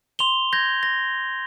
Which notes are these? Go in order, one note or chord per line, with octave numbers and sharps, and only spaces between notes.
C6 F7 G7
G6 G#6 A#6
A#6